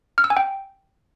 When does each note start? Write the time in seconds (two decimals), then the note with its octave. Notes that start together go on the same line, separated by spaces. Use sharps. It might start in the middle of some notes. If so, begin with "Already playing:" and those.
0.18 F6
0.24 E6
0.30 G#5
0.37 G5